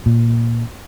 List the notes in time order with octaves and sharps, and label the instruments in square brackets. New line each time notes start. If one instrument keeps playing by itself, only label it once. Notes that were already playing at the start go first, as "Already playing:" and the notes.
[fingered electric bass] A#2